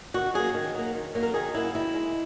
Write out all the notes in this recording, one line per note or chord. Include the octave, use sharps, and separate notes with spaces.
D#3 F#4
F#3 A#3 G#4
D#3
F#3 A#3
D#3
F#3 A#3
A#4
D#3 G#4
F#3 A#3 E4
D#3 E4
G#3